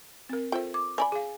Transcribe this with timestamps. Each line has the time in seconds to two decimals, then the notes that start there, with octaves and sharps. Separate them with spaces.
0.29 C4 A#4
0.52 F4 A4 C5 E5 G5
0.74 D6
0.98 C4 D5 G#5 B5
1.12 G#4 F5